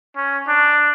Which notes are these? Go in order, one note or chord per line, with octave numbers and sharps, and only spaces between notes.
C#4
D4